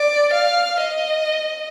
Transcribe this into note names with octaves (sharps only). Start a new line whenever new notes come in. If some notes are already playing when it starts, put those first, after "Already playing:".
Already playing: D5
F5
D#5